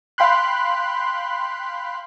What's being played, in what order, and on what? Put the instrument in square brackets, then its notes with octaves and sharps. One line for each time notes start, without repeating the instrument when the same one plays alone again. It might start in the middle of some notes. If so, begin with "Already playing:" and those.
[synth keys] F5 G5 B5 C6 F#6